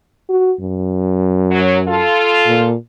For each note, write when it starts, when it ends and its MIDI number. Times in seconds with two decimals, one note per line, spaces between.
0.29 0.53 66
0.61 2.05 42
1.51 1.78 54
1.88 2.69 65
1.88 2.69 69
2.47 2.75 46